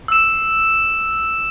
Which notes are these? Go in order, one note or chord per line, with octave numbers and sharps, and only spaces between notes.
E6 E7